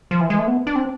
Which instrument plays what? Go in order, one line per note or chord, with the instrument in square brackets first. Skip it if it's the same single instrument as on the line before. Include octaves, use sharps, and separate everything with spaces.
[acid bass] F3
E3
G#3
A3
B3
D4
C4